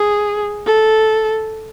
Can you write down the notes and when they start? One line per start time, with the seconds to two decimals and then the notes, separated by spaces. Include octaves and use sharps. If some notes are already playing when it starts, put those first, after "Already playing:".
Already playing: G#4
0.66 A4